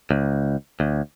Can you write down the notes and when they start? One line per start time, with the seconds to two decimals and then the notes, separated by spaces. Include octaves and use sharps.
0.11 C#2
0.80 D2